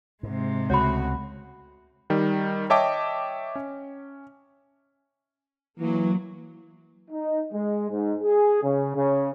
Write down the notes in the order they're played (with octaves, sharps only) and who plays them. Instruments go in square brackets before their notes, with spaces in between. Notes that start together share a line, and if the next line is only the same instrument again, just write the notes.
[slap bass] G#2 [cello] C3 G#3
[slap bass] C#2 [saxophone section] A3 B3 F#4 [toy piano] C#5 B5
[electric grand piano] D#3 G3
C#5 D#5 E5 G5 A5 D6
C#4
[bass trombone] E3 [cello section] F#3 A#3
[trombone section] D#4
G#3
G#2
G#4
C#3
C#3